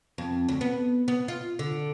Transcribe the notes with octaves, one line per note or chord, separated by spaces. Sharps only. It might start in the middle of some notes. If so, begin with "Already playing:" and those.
F2
D2
B3
B3
F4
D3